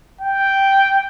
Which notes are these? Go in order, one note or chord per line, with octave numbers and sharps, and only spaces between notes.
G5